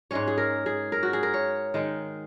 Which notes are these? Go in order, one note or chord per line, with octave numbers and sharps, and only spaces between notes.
G#2 G#3 C#4 C#5
G#4
A#4
G#4
A#4
F#4
G#4
A#4
C#5
D#3 G#3 D#4